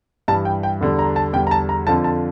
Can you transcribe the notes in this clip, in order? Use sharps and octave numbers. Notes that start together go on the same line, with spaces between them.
G2 E3 G3 A5
G5
G5
E2 D3 G3
A#5
A5
E2 D3 G3 G5
A#5
A5
A#5
F2 D3 F3 A5
A5